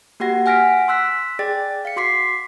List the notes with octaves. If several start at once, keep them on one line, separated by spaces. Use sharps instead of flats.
A#3 F#4 G4 F#5 A#6
F#5 G#5 F6 A#6 B6 D7
C6 E6 F#6 B6
G#4 D5 G5 A6
F5 C#7
F#4 C6 D6 B6 C7